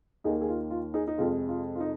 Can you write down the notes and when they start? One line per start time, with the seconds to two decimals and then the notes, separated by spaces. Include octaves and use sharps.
0.24 D#2 D#3 A#3 D#4 G#4
0.41 G#4
0.48 F4
0.71 F4
0.94 D#4 G#4
1.08 D#4
1.18 F2 C3 G#3 F4
1.49 F4
1.75 F4
1.80 D#4